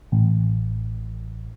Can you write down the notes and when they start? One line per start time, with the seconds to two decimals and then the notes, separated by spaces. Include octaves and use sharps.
0.12 A1